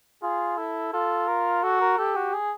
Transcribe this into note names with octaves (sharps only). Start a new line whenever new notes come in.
F4 G#4
E4 A4
F4 A4
A#4
F#4 A4
A#4
G4 A4
F#4
G#4